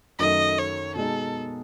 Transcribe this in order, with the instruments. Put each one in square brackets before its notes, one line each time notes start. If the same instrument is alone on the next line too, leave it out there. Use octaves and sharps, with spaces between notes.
[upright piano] F#2 D#3 A3 [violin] D#5
[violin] C#5
[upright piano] B2 G#3 D#4 [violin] A4